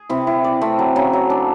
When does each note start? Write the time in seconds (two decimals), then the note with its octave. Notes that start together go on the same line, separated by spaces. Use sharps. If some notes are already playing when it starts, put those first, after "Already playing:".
Already playing: G#4
0.10 C3 E4
0.27 E4
0.44 D5
0.61 C3 A3
0.79 F#3
0.96 C#3 F#3
1.13 F#3
1.30 D4